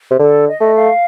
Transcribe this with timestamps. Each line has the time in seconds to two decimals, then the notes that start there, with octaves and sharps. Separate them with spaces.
0.11 C3
0.19 D3 A4
0.46 D#5
0.60 A3
0.74 F5